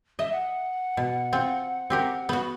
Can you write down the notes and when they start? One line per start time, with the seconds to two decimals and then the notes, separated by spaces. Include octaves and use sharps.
0.19 D#5 E5
0.32 F#5
0.97 B2
1.33 C4 F4
1.90 C4 G4 A#4
2.29 B3 F#4